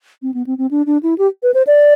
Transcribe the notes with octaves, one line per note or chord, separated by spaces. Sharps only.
C4
B3
C4
C4
D4
D4
E4
G4
B4
C5
D5